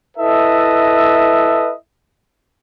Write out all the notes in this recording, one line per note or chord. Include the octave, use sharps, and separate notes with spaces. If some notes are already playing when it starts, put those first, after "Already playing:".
E4 A4 B4 D#5 E5